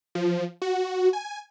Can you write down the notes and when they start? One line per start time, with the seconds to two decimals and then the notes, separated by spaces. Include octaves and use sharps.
0.15 F3
0.62 F#4
1.13 G#5